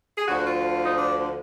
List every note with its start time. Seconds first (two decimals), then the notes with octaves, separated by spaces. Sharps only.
0.18 G#4
0.28 D2 D3 F3 F#4
0.45 F4
0.86 D#4
0.97 D4